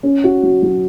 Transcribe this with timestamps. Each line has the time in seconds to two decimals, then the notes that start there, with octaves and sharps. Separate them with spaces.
0.03 C#4
0.24 F#4
0.43 F#3
0.63 F#3